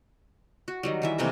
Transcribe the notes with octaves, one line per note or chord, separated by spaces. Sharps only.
F#4
D#3 F#3 G3
D#3 E3 E5
C3 E3 A3 A#3